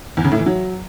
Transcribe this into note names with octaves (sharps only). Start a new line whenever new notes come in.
E2
C#3
A2
E3
F#3